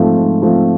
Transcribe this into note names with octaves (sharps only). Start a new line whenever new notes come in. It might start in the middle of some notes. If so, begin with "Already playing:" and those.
Already playing: G#2 F3 A3 C4 F4
G#2
F3 A3 C4 F4